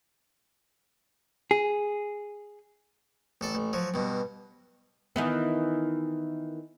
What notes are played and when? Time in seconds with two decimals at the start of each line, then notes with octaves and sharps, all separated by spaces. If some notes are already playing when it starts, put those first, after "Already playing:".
1.51 G#4
3.41 A1 A4 D5
3.55 A1
3.73 F3 F#3
3.94 G2 B2
5.16 D#3 E3 B3